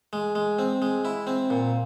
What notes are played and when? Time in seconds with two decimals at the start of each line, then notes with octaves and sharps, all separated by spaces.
0.13 G#3
0.35 G#3
0.59 C4
0.82 G#3
1.05 E4
1.27 C4
1.50 A#2